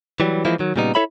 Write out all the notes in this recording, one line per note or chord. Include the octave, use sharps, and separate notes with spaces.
E3 F#3 G3
E3 F3 G#3 A#3 E4
D#3 F#3
A#2 C#3 G3 B3 D#4
E4 A4 C#5 E5 B5